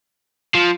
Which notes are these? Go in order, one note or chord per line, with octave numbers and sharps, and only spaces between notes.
F3